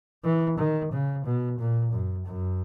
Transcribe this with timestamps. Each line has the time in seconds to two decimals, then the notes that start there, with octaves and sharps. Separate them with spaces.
0.24 E3
0.58 D#3
0.92 C#3
1.25 B2
1.59 A#2
1.92 F#2
2.26 F#2